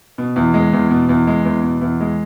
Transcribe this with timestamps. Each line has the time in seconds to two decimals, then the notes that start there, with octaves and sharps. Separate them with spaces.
0.18 B2
0.36 E2
0.54 G#3
0.73 E2
0.91 B2
1.09 E2
1.27 G#3
1.45 E2
1.63 B2
1.81 E2
2.00 G#3